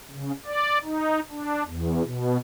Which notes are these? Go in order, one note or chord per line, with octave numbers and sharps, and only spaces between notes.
C#3
D5
D#4
D4
E2
B2